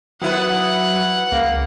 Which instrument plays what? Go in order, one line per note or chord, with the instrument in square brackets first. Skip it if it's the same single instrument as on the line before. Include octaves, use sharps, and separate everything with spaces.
[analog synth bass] F#3 [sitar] B3 E4 B4 [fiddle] F#5
[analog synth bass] C#2 [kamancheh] A#3